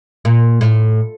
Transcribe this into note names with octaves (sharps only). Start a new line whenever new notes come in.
A#2
A2